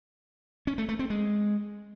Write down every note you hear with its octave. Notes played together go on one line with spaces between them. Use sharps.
C#4
A3
A3
C4
G#3